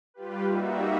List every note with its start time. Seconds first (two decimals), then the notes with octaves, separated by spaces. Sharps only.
0.14 G3 F4 G4 B4
0.46 G3 A#3 D#4 F#4 E5